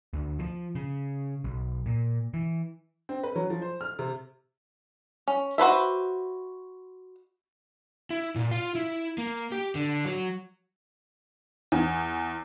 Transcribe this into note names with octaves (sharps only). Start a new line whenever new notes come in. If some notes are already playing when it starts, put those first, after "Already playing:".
D2
F3
C#3
B1
A#2
E3
C4
B4
F#3
F3
C5
F6
C3
C#4
F#4 B4 C5 E5
E4
A#2
F4
E4
A#3
G4
D3
F#3
E2